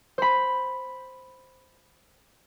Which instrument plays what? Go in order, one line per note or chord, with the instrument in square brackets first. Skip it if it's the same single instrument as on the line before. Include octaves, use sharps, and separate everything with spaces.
[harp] C5 B5